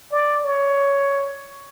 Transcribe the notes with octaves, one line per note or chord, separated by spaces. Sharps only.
D5
C#5